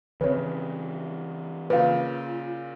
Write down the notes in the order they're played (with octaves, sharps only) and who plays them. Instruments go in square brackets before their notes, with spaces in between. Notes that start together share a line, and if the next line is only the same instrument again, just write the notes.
[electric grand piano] C#3 [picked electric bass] E3 C4 [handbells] B4 C#5
[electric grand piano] A#2 C#3 [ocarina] F4 [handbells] B4 F5